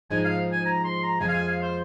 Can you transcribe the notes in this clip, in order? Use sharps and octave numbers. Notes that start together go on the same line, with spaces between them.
G#2 F3 G#3 D#4 G#5
F5
G#5
A#5
C6
A#5
F2 F3 G#3 F4 G#5
F5
G#5
F5
C5